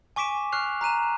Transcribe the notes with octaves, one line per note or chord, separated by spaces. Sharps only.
G#5 C#6 D6 B6 D7 E7
C#6 F6 F#6 C7 F7
A#5 F#6 D#7 E7